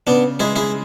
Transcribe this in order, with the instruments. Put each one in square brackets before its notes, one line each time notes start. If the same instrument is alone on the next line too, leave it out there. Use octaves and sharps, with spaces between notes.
[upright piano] C#3 [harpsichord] B3 D4
[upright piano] G#3 [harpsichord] E4 G#4
[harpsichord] E4 G#4